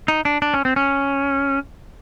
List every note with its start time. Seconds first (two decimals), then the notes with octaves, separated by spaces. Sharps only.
0.08 D#4
0.25 D4
0.42 D4
0.54 C#4
0.65 C4
0.76 C#4